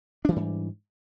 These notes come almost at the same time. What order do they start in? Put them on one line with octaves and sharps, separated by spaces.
D4 E3 G3 G#2